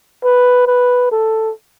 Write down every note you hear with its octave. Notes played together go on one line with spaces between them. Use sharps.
B4
B4
A4